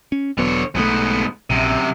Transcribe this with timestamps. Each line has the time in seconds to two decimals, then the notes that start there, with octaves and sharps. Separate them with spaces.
0.12 C#4
0.38 E1 D3 F#3 B3 C#5
0.75 B1 G#2 E3 A3 B3
1.50 A#1 F#2 C3